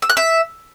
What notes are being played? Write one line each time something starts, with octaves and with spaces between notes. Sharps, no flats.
E6
F#6
E5